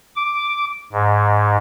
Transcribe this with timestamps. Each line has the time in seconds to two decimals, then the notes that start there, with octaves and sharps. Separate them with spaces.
0.16 D6
0.92 G#2